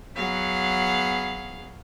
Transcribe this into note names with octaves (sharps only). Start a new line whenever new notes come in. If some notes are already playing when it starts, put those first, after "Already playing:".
F#3 B3 G#4 F5 F#5